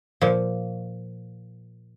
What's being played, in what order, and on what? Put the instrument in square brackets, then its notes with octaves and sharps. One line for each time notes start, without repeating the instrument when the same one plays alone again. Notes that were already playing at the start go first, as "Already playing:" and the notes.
[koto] A#2 F3